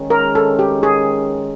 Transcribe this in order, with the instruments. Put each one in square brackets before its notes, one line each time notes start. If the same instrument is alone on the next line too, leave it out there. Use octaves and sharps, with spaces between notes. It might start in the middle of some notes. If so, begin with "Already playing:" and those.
Already playing: [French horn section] D#3 G#3 C#4
[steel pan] A#4
A4
G4
G#4